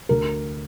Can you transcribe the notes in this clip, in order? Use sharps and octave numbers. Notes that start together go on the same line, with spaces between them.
D2 A#4